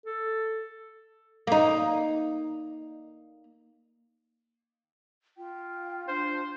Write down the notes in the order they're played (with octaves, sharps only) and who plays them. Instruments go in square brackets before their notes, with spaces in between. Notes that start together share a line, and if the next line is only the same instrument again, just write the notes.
[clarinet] A4
[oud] A#3 D#4
[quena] F4 [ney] G5
[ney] D4 [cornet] C5